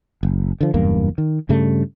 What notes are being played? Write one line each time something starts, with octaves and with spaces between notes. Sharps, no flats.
F#1
D3 F3
F#1 E2 G2 A#3
D#3
G2 C#3 G3 A3